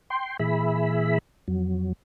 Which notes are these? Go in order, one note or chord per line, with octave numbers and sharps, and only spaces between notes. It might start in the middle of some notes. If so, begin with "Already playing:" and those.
G5 C6
A#2 E3 G#4 E5 B5
F2 F#3